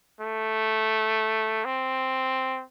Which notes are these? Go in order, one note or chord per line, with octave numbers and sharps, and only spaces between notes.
A3
C4